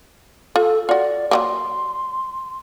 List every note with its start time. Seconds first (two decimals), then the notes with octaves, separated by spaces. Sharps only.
0.56 F4 A4
0.89 F4 F#4 D5
1.31 F#3 G3 A#3 C6